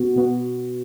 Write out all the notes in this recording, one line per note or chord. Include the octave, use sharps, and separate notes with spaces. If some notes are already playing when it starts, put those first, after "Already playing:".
Already playing: B2 B3 F#4
B2 B3 F#4